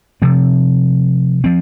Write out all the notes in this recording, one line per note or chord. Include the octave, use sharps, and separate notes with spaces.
C3 F3 C4
F3 C4